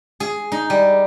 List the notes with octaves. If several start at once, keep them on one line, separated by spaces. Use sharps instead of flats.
G#4
D#4
G3